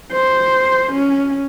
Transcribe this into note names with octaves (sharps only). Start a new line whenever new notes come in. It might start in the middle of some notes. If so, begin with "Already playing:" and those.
C5
C#4